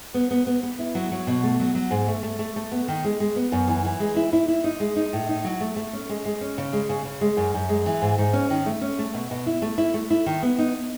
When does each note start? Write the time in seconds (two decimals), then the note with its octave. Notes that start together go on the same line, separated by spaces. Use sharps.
0.14 B3
0.31 B3
0.47 B3
0.63 B3
0.79 E4
0.95 F#3
1.12 F#3
1.27 B2
1.44 A3
1.60 F#3
1.75 F#3
1.91 G#2
2.07 A3
2.23 A3
2.39 A3
2.56 A3
2.72 B3
2.88 D#3
3.04 G#3
3.20 G#3
3.36 B3
3.52 F#2
3.68 E3
3.85 E3
4.00 G#3
4.16 E4
4.33 E4
4.48 E4
4.64 D#4
4.80 G#3
4.96 D#4
5.13 A2
5.29 D#4
5.44 F#3
5.61 A3
5.76 A3
5.93 C#4
6.09 G#3
6.25 G#3
6.41 C#4
6.58 C#3
6.73 G#3
6.89 C#3
7.05 C#3
7.21 G#3
7.37 F#2
7.54 F#2
7.69 G#3
7.86 E3
8.02 G#2
8.18 G#2
8.33 C#4
8.50 D#3
8.66 A3
8.81 C#4
8.99 A3
9.14 B2
9.31 B2
9.46 E4
9.62 A3
9.78 E4
9.94 A3
10.10 E4
10.26 D#3
10.42 B3
10.59 D#4